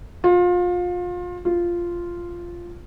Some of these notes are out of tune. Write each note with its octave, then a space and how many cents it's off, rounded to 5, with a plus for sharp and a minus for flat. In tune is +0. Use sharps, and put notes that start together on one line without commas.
F4 +30
F4 -5